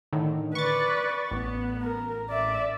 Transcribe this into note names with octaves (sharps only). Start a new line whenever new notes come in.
A2 D3 D#3
B4 D5 C#6 A6
A1 B3
A#4
D5 E5